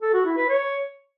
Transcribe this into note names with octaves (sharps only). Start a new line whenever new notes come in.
A4
F#4
E4
B4
C#5